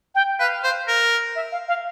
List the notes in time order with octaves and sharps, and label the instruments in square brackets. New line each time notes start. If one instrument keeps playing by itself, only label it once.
[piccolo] G5
[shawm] B4 [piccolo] F5
[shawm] C5
A#4
[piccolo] E5
F5
F5